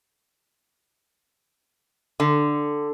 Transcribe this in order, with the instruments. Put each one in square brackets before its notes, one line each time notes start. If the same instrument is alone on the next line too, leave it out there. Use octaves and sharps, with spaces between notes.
[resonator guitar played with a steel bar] D3